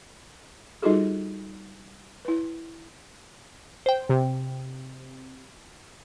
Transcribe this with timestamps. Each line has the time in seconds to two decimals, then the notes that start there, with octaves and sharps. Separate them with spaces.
0.82 G3 D#4 F4 F#4 G#4 A4
2.25 E4 B4
3.86 C5 G5
4.09 C3